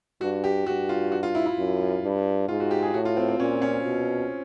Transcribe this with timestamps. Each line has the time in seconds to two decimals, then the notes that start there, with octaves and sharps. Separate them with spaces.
0.21 G2 F#4
0.44 G4
0.66 G2 F#4
0.89 F4
1.12 F#4
1.23 F4
1.35 E4
1.46 E4
1.57 F#2
2.03 G2
2.48 G#2 F4
2.60 F#4
2.71 G4
2.82 G#4
2.94 A2 F#4
3.05 F4
3.17 C4
3.28 C4
3.39 A#2 C#4
3.62 C#4
3.86 B2